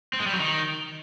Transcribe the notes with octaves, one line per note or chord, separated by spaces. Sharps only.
C4
G#3
G3
F#3
D#3